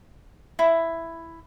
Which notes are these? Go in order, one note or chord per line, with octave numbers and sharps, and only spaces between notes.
E4